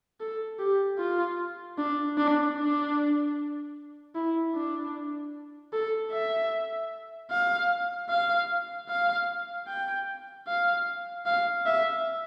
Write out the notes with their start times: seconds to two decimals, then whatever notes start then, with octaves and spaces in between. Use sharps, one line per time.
0.20 A4
0.59 G4
0.99 F4
1.78 D4
2.18 D4
2.57 D4
4.15 E4
4.55 D4
5.73 A4
6.12 E5
7.31 F5
8.10 F5
8.89 F5
9.68 G5
10.48 F5
11.26 F5
11.66 E5